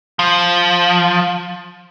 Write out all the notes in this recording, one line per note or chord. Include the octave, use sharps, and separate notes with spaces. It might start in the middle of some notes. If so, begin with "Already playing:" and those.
F3